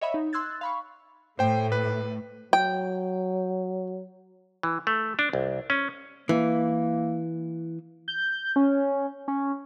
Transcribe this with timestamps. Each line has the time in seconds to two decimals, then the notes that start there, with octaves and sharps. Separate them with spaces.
0.01 C#5 D#5 E5 F#5 B5
0.14 D#4
0.33 C6 E6 F#6 G#6 A6
0.61 F5 B5 C#6
1.39 A2 A3 C5 G5
1.72 B4
2.53 F#3 G5
4.63 E3
4.87 A3
5.19 D4
5.33 C2
5.70 C#4
6.29 E3 A#3
8.08 G6
8.56 C#4
9.28 C#4